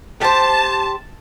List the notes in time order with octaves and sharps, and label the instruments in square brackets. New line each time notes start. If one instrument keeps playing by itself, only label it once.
[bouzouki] G4 C5 [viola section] A5